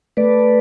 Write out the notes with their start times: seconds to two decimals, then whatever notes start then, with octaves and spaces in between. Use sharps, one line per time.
0.17 A3 B4 D5